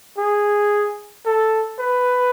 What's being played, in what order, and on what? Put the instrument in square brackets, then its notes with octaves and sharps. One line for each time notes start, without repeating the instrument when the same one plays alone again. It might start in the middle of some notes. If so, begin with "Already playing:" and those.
[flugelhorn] G#4
A4
B4